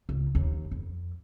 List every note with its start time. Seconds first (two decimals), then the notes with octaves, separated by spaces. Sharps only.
0.09 C#2
0.35 D#2
0.71 F2